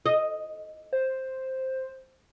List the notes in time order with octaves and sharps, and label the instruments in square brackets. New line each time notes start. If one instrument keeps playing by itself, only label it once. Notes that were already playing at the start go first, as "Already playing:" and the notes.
[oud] D#5
[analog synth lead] C5